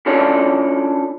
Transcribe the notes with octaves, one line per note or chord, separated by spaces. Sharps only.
C#4 D4 F4 A4 C#5 D5